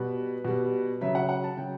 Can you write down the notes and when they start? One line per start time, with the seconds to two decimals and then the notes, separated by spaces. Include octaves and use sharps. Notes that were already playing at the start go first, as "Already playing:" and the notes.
Already playing: B2 G3 B4
0.45 B2 G3
1.01 C#3 F#3 E5
1.15 F#5
1.29 F#5
1.44 A5
1.57 C#3 F#3 G5